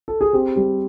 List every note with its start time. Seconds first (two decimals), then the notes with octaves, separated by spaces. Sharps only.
0.08 A4
0.21 G#4
0.33 C4 G4
0.56 G3 G4